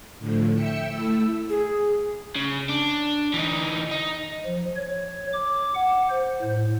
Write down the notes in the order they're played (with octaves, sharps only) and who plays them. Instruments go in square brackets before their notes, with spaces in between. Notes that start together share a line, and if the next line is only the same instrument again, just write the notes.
[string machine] A2 D3 F3
E5 G5 E6 C#7
A3 E4 E6
[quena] G#4
[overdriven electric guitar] C#3
D4
E3 D#4
D#4
[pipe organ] F3
C#5
D6
F#5
C5
A2